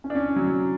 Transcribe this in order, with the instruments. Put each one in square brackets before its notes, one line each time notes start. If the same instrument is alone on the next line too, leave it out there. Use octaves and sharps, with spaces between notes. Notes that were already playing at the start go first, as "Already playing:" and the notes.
[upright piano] C#4
D4
C#4
F#3
F#3